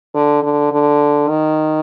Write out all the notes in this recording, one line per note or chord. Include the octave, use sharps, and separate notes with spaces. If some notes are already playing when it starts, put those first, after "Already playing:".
D3
D3
D3
D#3